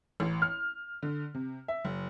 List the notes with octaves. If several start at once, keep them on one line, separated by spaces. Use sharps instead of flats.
A1
F6
D3
C3
E5
F#1